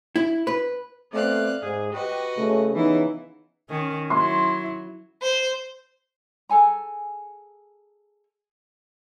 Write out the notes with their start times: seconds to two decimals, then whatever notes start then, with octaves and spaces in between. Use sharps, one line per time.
0.16 E4
0.47 B4
1.12 A3 B3 C4 D5 F5 F#6
1.62 G#2 G#4
1.92 F#4 G4 B4 D#5
2.36 C#3 A3
2.74 C#3 E3 B3 D#4 E4
3.70 D#3 C#4
4.10 F#3 E4 C6
5.22 C5
6.49 G#4 A4 G#5 A#5